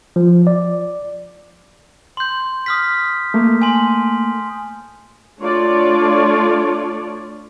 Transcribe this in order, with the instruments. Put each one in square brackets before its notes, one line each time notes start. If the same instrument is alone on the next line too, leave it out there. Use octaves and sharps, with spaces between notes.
[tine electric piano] F3
D5
[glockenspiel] C6 G6
D#6 F6 B6
[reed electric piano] A3 A#3
[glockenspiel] G#5 A5 C6
[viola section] A3 D4 F4 C#5 D5